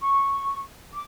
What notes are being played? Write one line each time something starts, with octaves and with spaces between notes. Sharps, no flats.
C#6
D6